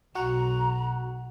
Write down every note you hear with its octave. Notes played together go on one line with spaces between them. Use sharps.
B1 F#4 F#5 A#5